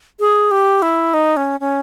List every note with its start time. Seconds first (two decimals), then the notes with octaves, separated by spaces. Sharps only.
0.20 G#4
0.51 G4
0.82 E4
1.14 D#4
1.37 C#4
1.60 C#4